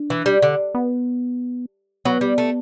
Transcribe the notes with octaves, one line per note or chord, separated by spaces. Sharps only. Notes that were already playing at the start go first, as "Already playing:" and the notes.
Already playing: D4
E3
G3
D3
B3
F#3 B3
G3
A3